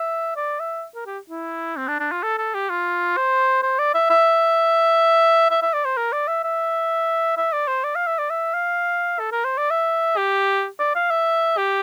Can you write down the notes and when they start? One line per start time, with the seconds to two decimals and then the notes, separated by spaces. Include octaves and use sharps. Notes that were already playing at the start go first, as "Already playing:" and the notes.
Already playing: E5
0.36 D5
0.60 E5
0.95 A#4
1.06 G4
1.30 E4
1.77 C4
1.88 D4
2.00 D4
2.12 F4
2.23 A4
2.38 A4
2.54 G4
2.70 F4
3.17 C5
3.63 C5
3.79 D5
3.94 E5
4.10 E5
5.50 E5
5.62 E5
5.73 D5
5.85 C5
5.97 A#4
6.12 D5
6.28 E5
6.44 E5
7.37 E5
7.53 D5
7.67 C5
7.84 D5
7.95 F5
8.07 E5
8.19 D5
8.30 E5
8.54 F5
9.19 A4
9.32 A#4
9.45 C5
9.57 D5
9.70 E5
10.17 G4
10.79 D5
10.95 F5
11.11 E5
11.57 G4